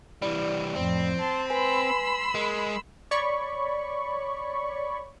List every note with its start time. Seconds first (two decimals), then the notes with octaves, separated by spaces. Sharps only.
0.22 E3 G3 E4 D5 B5
0.75 F2 A2 C4
1.19 A5 C6
1.50 B4 G#5 B5 C6 E6
2.35 G#3 A#4
3.11 C#5 D5 B5 C#6